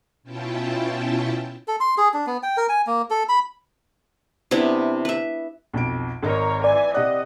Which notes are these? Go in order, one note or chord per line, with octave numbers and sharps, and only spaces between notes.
B2 C#4 E4 F4 G5 A5
A4
C6
G#4
D4
B3
G5
A#4
G#5
A#3
A4
B5
C3 B3 D4 E4
B4 E5
B1 F2 D7
G#1 A#4 C#5 D#5
E3 D5 G#5
C3 D5 D#5 F#5 F#6